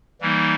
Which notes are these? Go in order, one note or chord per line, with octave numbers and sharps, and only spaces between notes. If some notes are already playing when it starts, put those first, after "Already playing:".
E3 G3 A#3 D#4